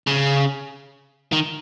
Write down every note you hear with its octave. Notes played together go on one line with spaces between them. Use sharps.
C#3
D#3